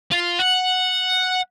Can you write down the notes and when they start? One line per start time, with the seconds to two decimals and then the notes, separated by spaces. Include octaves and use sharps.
0.11 F4
0.39 F#5